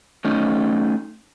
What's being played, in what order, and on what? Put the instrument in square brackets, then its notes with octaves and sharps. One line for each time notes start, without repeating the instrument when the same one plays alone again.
[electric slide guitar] A3 C#4 D#4